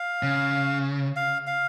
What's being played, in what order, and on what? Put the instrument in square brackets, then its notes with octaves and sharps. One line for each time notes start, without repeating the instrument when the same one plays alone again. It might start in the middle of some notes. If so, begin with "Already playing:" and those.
Already playing: [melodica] F5
[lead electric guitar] C#3
[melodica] F5
F5